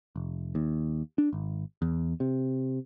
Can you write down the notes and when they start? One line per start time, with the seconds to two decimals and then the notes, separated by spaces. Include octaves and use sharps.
0.16 F1
0.55 D#2
1.18 D4
1.33 G#1
1.82 E2
2.20 C3